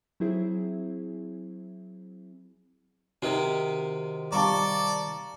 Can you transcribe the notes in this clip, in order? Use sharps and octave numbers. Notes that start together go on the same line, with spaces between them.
F#3 C4 E4 G#4
C3 D#3 F#4
G3 D5 F5 A5 A#5 C#6 D6